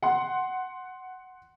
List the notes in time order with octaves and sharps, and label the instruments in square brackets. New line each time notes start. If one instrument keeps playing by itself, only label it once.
[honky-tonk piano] F#5 C6